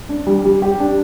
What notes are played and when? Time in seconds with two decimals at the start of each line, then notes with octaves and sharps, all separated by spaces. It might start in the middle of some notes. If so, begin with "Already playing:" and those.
0.09 D4
0.27 G3
0.45 G3
0.62 G4
0.80 D4